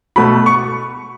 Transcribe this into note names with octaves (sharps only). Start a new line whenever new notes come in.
B2 A3 B5
C#6